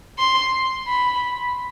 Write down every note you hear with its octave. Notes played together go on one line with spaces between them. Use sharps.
C6
B5